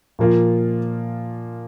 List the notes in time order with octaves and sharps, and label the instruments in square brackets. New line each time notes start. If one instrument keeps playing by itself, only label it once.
[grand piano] A#2 F3 A#3 F4